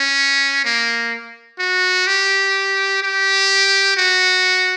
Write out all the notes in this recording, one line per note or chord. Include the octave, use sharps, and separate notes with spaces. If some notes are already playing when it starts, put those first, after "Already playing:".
Already playing: C#4
A#3
F#4
G4
G4
F#4